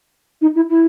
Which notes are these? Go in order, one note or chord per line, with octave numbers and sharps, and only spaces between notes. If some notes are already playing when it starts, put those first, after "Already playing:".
D#4
E4
E4